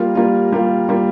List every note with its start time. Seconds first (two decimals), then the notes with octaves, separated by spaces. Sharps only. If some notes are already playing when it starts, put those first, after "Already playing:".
Already playing: G3 A#3 F4
0.15 G3 A#3 F4
0.52 G3 A#3 F4
0.88 G3 A#3 F4